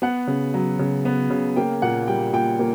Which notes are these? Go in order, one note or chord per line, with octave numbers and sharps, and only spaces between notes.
B3 F#5
C#3
F#3
C#3
B3
C#3
A#3 G5
A#2 F#5
G3 G5
A#2 G5
A#3